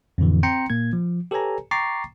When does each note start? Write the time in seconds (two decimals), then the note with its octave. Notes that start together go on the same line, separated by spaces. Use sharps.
0.18 F2 A2 D3 E3
0.43 C4 G5 A#5 C6 C#7
0.70 A#2 A#3 G#6
0.93 F3
1.31 G4 A4 B4 C#5 G#5 A#5
1.71 G5 A#5 C#6 D6 A6 C7